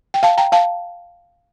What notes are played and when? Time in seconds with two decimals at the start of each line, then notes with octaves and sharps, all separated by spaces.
0.14 G5
0.23 F5 A5
0.38 G5 A#5
0.52 F5 A5